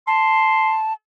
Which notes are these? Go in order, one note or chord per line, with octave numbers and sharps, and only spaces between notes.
A5 C6